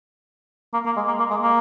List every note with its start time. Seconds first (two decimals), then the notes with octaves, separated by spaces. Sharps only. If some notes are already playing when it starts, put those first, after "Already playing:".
0.74 A#3
0.85 A#3
0.97 G#3
1.08 A#3
1.19 A#3
1.30 G#3
1.41 A#3